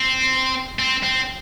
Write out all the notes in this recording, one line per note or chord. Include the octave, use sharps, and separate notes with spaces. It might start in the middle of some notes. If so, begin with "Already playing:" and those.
Already playing: C4
C4
C4